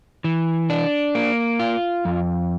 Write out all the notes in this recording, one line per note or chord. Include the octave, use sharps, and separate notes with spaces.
E3
D4
A#3
F4
F2